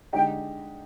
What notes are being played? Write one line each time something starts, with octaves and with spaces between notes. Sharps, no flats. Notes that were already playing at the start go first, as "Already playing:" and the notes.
D3 G#3 D#4 G4 G5